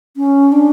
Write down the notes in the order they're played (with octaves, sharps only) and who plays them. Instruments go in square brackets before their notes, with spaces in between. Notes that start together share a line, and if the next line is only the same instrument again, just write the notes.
[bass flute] C#4
D4